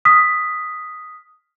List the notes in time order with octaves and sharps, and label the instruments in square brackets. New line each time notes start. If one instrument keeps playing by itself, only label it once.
[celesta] D#6 F6 B6